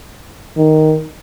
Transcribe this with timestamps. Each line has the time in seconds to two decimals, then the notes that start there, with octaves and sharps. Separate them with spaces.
0.57 D#3